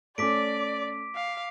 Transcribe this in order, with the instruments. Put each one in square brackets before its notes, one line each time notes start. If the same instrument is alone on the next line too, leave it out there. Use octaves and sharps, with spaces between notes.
[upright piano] A3 C#4 [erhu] D5 [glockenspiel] D6 B6 D7
[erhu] F5